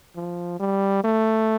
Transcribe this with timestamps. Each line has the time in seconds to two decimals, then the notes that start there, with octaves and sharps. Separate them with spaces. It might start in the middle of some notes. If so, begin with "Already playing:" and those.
0.16 F3
0.59 G3
1.04 A3